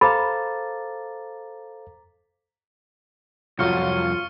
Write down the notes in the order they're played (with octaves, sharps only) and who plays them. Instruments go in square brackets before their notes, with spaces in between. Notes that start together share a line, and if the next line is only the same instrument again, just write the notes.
[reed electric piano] A4 C5 F5 [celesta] A#5 D6 A6 [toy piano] B5
[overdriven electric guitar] C2 F2 [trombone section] F#3 [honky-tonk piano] F4 [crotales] C#6 F6 C#7